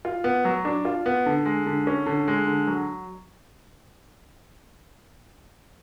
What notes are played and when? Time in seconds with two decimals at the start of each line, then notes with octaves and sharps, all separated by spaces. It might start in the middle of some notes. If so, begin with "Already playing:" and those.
0.05 F4
0.24 B3
0.45 F#3
0.65 D4
0.85 F4
1.06 B3
1.26 D3
1.45 G#3
1.66 D3
1.87 C#4
2.06 D3
2.28 G#3
2.47 D3
2.67 F#3